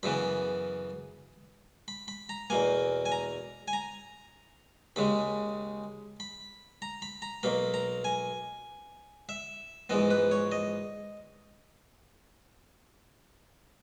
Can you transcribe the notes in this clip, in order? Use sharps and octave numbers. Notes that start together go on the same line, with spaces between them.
F#2 C#3 E3 B3 B5
B5
B5
A#5
E2 B2 A#3 G#5
G#5
A#5
G#5
A#5
D#2 C#3 G#3 B5
B5
A#5
B5
A#5
B1 B2 A#3 B5
A#5
G#5
E5
A#1 G#2 E3 B3 D#5
B4
C#5
D#5